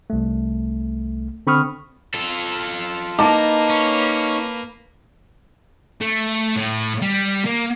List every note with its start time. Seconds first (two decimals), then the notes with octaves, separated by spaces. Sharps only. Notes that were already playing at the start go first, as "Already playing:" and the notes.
0.10 C2 A3
1.47 D3 C4 B5 C#6 D#6 F6
2.14 F4 A4
3.19 A#3 D#4 B4 A5 D6
3.70 C#4
6.01 A3
6.56 A2
7.02 G3
7.46 A#3